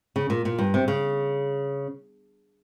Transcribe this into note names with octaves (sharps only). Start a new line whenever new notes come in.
C#3
A#2
A#2
G2
C3
C#3